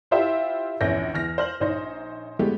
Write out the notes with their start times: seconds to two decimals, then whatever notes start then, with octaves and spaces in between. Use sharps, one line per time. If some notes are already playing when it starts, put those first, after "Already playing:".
0.11 E4 F4 G4 C5 E5 G5
0.81 A#1 E2 C#4 G6 A#6
1.14 E2 F6 A#6
1.38 C5 F6 F#7
1.60 A#1 D#4 C5 C#5 A#6
2.39 F#3 G#3 A3 B3 G4